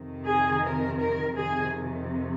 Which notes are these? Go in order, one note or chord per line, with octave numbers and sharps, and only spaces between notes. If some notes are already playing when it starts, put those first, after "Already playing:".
Already playing: F2 C3 D#3
G#4
A#4
A#4
F2 C3 D#3 G#4